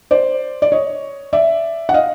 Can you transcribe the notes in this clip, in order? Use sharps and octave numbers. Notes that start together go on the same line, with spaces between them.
C5 D5
D5
C#5 D#5
D5 E5
F#5
D#5 F5